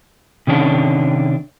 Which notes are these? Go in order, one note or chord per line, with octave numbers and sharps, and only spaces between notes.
C3 D#3 C#4 D4